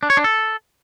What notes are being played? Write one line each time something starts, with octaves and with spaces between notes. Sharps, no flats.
D4
C#5
D4
A4